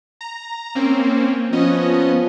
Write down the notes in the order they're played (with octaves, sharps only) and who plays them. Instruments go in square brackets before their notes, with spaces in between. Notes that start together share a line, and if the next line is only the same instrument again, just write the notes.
[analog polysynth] A#5
A#3 C4 C#4
[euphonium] F3 [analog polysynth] B3 C#4 D#5